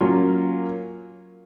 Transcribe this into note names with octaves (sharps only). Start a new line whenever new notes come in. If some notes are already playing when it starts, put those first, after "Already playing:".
F#3 A#3 C#4 F4